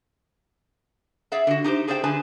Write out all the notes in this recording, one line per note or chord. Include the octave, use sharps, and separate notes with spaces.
G#4 D5 E5 F#5
D3 F#4
D#4 G4 A#4 C5
G#4 A4 C5 D5 F5 G5
D3 G#4 B4 G#5 A5